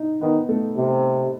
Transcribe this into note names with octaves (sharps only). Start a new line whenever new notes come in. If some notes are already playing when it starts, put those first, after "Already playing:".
Already playing: D#4 D#5
D#3 B3 B4
A3 A4
C3